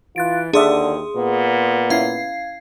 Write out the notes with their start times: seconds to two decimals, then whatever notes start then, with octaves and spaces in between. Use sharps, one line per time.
0.16 E3 F4 F#6 A6 D7
0.53 D#2 D3 D4 G#4 D5 E5 C6 D#6
1.16 A#2 B3
1.90 C#4 E4 F5 G#6 C7